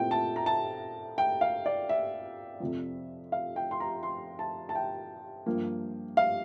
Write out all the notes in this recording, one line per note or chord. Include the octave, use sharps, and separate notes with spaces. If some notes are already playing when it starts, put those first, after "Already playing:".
Already playing: A#2 A3 C4 E4 G5
A5
A#5
A5
G5
F5
D5
E5
F2 C3 F3
F5
G5
C6
A#5
C6
A5
A5
G5
G2 F3 A#3
F5